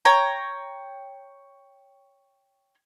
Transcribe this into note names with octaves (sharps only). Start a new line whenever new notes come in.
C#5 G5 A#5